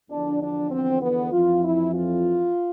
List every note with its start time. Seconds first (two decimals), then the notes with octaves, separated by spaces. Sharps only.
0.10 E2 D3 F3 D4
0.41 D4
0.71 C4
1.01 B3
1.32 F2 E3 F4
1.62 E4
1.93 F4